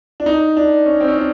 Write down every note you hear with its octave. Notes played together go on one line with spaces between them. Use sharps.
D4
D#4
D4
C#4
C4
C#4
D4